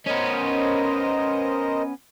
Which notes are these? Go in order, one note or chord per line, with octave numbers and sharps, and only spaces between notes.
B3 C#4 A#4 C5 D#5